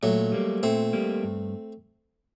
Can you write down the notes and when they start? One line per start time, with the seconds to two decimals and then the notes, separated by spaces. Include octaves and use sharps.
0.03 A#2 F#3 A3
0.32 G3 A#3
0.63 A#2 A3 C4
0.93 G3 A#3
1.24 G2